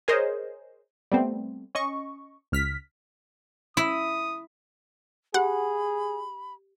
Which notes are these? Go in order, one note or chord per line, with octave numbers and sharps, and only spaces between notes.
G#4 A#4 C5 C#5 D#5
G3 A3 B3 C4
C#4 D#5 C#6
C#2 F6 B6
E4 D#6
G4 G#4 F#5 B5